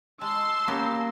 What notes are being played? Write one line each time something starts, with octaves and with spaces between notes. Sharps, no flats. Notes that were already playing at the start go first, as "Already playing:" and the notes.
G#3 A5 C6 E6
A#3 B3 C#4 G4